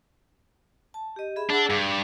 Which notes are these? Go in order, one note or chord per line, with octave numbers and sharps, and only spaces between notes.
A5
G4 D#5
G#4 E5 B5
D4 G#4 F#5 E6
G2 D6